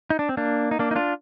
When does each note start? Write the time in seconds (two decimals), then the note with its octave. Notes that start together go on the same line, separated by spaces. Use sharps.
0.10 D#4
0.19 D4
0.29 C4
0.37 A#3 D4
0.71 D#4
0.79 A#3 D4
0.91 D#4
0.96 D4 F4